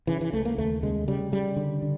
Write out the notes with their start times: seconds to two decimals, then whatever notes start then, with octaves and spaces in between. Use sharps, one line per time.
0.07 C#3 E3
0.21 E3
0.33 C#2 A3
0.45 A#3
0.58 D#2 A3
0.83 C#3 G#3
1.08 C#3 G3
1.32 C#3 G3
1.56 D3
1.82 D3